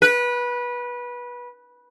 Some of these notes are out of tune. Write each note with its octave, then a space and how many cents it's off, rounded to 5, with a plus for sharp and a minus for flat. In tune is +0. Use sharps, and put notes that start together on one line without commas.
B4 -20